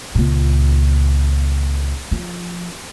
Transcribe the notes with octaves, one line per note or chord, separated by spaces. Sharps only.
C#2 A#2
F3